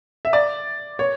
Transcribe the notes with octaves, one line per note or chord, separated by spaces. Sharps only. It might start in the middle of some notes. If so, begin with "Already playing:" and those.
E5
D5
C#5